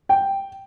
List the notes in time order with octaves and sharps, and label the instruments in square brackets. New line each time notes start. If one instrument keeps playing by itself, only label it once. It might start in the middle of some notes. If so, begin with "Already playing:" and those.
[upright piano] G5